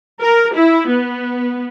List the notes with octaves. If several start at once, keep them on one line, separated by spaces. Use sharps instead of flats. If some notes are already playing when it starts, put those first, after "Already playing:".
A#4
E4
B3